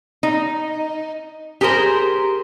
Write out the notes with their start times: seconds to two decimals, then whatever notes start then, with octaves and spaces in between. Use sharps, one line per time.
0.23 D#4
1.61 G4 G#4 A#4 C5